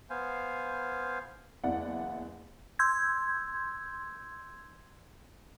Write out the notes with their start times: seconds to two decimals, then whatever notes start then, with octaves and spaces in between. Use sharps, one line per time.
0.10 B3 C5 F5 G#5
1.64 F#1 E2 E4 D5 F5 F#5
2.79 C6 E6 G6 G#6